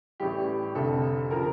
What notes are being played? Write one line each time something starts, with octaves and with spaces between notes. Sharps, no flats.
A1 A2 G3 G4
F1 F2 D3 A4
C#3 F3 A#4